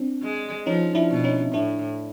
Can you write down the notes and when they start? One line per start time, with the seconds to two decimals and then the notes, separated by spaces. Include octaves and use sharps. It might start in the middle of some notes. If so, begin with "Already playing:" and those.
Already playing: C4 D4
0.22 G#3
0.66 F3 C#4 D#4
0.95 D4 E4
1.11 B2
1.24 C#4 D#4
1.53 A2 D4 E4